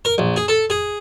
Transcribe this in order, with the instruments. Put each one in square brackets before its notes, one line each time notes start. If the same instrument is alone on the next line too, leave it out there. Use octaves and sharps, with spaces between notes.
[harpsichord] A#4
A#1
G#4
A4
G#4